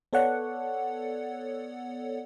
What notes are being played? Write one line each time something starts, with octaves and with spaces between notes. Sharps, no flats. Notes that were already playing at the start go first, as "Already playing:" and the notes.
B3 A4 C#5 D5 F#5